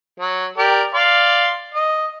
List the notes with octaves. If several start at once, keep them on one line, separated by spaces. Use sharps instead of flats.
F#3
G4 A#4 D5
D5 F5 C6
D#5